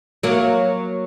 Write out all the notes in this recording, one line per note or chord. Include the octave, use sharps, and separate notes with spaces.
F#3 A#3